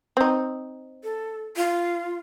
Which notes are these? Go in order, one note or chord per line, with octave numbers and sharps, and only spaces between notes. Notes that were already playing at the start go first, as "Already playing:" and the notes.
C4 D#4
A4
F4